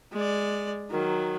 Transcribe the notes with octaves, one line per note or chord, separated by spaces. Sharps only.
G#3 D5
D#3 F#3